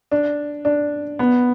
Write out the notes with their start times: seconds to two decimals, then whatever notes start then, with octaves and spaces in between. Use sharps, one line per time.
0.11 D4
0.65 D4
1.19 B3